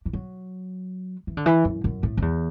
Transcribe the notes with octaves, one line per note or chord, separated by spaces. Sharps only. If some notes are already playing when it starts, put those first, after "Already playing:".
E3
F#3
E3
D3
E3
F#2
F#2
A2
F#2
E2